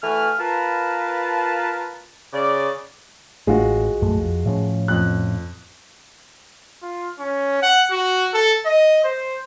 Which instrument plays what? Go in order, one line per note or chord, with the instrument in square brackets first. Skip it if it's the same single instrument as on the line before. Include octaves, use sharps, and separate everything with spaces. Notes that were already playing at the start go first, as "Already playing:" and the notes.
[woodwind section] E3 A3 F#4 B4 G#5 F6
F4 A#4 B4 A5
C#3 D5
[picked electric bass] A1 [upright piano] G#3 F4 F#4
[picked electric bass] A#1 F#2 A3
F2
A2 F3 C#4
[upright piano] F2 F#6
[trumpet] F4
C#4
F#5
F#4
A4
D#5
C5